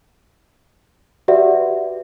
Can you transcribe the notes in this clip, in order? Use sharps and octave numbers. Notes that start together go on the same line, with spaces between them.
F#4 G4 B4 D5 E5 F#5